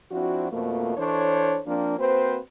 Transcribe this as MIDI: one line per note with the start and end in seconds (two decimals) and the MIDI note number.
0.12 0.49 53
0.12 0.49 60
0.12 0.49 62
0.12 0.49 64
0.12 0.49 66
0.52 0.98 41
0.52 0.98 47
0.52 0.98 53
0.52 0.98 57
0.52 0.98 58
0.98 1.60 52
0.98 1.60 62
0.98 1.60 69
0.98 1.60 72
0.98 1.60 73
1.67 1.97 53
1.67 1.97 58
1.67 1.97 60
1.67 1.97 62
1.98 2.37 58
1.98 2.37 60
1.98 2.37 66
1.98 2.37 71
1.98 2.37 72